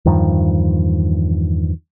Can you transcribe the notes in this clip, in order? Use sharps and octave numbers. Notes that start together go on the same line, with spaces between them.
E2 G2 D#3 F3